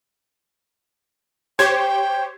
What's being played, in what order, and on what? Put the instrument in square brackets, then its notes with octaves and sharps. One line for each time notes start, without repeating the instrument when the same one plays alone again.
[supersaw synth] G4 C5 C#5 [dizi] G5 [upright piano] G#6